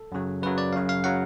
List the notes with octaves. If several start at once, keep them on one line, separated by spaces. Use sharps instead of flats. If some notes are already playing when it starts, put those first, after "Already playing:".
Already playing: A4
F#2 C#3 F#3
F#2 C#3 F#3 B4
D5
F#2 C#3 F#3 F5
F5
C#3 F#3 F#5